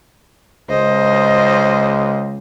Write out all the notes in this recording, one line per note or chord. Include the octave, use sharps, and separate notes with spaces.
C#2 C5 D#5